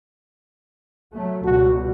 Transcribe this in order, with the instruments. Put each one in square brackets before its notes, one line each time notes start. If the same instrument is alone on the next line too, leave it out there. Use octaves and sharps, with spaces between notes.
[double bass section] F#3 A3
[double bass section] C#2 B2 G3 [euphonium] F#4